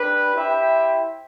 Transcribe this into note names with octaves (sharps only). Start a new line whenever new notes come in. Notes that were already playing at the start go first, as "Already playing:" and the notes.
Already playing: D4 G4 B4
E4 G4 C5 E5 G5